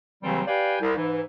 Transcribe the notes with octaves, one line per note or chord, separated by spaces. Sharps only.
D#2 C#3 E3 F#3 G3 C4
G4 B4 D5 F5 G5 G#5
C2
G#2 E3